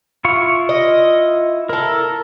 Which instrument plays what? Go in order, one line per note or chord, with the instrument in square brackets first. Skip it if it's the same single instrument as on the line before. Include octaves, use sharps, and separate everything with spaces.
[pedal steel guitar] E4 F4 C#6
[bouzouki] D#5
[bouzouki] E4 A4 [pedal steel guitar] A#4